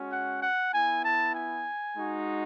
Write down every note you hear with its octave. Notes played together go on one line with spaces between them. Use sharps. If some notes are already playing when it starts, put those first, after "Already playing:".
Already playing: G#3 C#4 F#4
F#5
F#5
B3 E4 G#5
A5
G#5
G#3 D#4 F#4